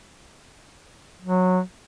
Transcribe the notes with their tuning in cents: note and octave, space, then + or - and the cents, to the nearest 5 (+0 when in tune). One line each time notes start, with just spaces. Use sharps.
F#3 -15